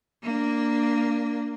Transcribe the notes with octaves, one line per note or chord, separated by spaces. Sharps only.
A#3 D4